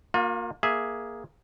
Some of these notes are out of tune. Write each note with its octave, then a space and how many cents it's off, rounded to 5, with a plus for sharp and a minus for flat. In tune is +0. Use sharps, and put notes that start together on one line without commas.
A#3 +0 F4 +40
A#3 +15 G#4 +0 E5 +0